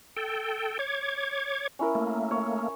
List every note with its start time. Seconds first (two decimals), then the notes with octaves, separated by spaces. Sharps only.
0.17 A4 G5
0.79 C#5 D6 G#6
1.79 C#4 E4 A#4
1.95 A3 A#3
2.31 C#5